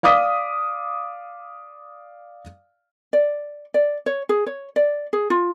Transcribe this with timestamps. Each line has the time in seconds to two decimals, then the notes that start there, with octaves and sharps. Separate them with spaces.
0.03 D5 F5 D6 D#6 B6
3.13 D5
3.74 D5
4.06 C#5
4.29 G#4
4.46 C#5
4.76 D5
5.13 G#4
5.30 F4